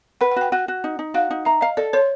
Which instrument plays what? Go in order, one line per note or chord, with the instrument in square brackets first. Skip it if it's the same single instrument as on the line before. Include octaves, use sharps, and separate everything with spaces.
[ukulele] B4 [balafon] F#5
[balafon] F#5
[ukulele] F#4 [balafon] G5
[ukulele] F#4 [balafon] F#5
[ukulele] F#4
D#4
D#4
[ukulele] F#4 [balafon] F5
[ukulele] D#4
[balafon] E5 [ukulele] A#5
[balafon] D#5 [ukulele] F5
[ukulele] A4 [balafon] D5
[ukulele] C5 [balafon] C#5